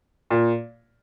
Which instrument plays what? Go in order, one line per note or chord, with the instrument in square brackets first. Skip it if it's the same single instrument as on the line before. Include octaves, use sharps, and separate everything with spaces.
[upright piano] A#2